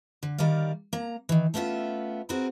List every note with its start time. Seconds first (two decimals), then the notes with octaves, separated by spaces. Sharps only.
0.23 D3
0.38 D#3 G3 A#4 D5 F5
0.93 A#3 A#5
1.29 D#3 E3
1.54 A3 B3 C#4 F4 E5
2.29 C4 F#4 G#4 A#4 B4